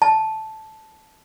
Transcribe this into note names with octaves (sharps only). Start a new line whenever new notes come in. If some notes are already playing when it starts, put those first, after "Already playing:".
A5